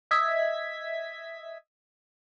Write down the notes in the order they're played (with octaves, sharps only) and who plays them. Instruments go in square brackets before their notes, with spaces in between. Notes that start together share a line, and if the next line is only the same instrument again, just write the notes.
[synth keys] D#5 E5 G#6 B6